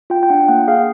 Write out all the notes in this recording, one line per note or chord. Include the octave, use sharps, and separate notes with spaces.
F4 G5
G5
D4 F#5
A#3 F#5
G#4 F5